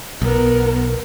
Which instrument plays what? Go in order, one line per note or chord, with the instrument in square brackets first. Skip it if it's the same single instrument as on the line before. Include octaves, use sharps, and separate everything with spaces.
[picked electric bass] B1 [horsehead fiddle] B3 A#4